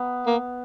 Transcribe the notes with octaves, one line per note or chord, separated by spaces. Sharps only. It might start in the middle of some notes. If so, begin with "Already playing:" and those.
Already playing: B3
A#3